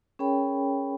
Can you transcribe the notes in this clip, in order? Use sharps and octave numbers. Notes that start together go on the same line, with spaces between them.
C#4 G#4 A#4 C#5 G5 B5